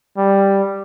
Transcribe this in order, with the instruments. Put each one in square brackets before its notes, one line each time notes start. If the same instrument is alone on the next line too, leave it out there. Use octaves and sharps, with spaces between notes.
[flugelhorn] G3